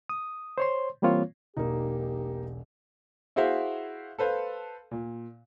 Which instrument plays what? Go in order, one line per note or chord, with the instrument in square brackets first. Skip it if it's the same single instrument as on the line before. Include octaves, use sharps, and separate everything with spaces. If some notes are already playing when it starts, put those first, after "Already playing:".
[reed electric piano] D#6
C5 C#5 C6
E3 G3 A#3 C4 F4 C#5
[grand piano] E1 B1 [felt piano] A#3 D#4 [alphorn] G4
[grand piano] E4 F#4 G#4 C5 E5 F5
A4 B4 C5 F5
A#2